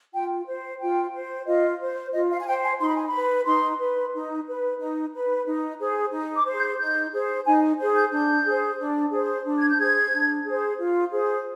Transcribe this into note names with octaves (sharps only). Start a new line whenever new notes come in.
F4 G5
C5
F4 G5
C5
F4 D#5
C5
F4 D#5
F5
G#5
C5 G5
G#5
D#4 C6
B5
G#5
B5
B4
D#4 C6
B4
D#4
B4
D#4
B4
D#4
G#4 C5
D#4
D6
C5
G#4
G6
D#4 G6
G#4 C5
D#4 G#5
G#4 C5
G6
D4 G6
G#4 C5
D4
G#4 C5
D4
G#6
G6
G#4 C5 G#6
D4
G#4 C5
F4
G#4 C5